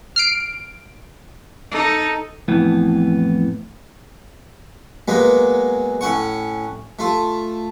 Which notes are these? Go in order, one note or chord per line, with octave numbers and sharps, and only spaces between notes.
F6 C7 D7
D#4 A4
F2 A2 E3 B3
F#3 G#3 A#3 B3
A2 C#4 F#5 C#6
A3 F4